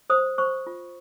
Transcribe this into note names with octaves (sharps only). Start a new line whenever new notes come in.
C5 D#6
C5 C#6
F4